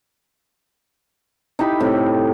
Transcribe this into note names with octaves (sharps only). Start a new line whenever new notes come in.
D#4 E4 G4 B5
A2 C3